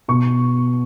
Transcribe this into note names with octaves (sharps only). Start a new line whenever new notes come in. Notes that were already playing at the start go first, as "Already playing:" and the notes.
B2 C#6